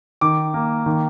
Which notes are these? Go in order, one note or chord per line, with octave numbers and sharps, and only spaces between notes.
D#3 D6
A#3
D#3